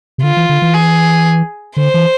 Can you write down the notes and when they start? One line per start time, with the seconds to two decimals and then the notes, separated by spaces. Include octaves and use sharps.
0.18 C3
0.23 D3 F4
0.37 E3
0.49 D3
0.62 E3
0.74 G#4
1.77 D3 C5
1.94 E3